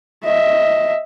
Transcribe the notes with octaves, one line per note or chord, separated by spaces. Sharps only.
D#5 E5